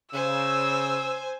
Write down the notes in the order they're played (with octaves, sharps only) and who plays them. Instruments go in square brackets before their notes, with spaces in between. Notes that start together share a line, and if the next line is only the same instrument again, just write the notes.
[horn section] C#3 [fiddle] C5 G#5 [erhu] E6